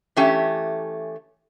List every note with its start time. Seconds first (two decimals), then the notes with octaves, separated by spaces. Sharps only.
0.17 E3 A3 C#4 G4